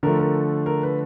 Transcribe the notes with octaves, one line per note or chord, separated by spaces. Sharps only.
D3 F3 A3 A#4
A#4
A#4
B4